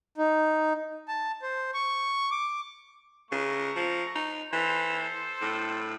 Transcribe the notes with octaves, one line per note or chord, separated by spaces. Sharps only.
D#4
A5
C5
C#6
D6
C#3 A3 A#5 C#6
F3
D#4
E3 A4 C5
A2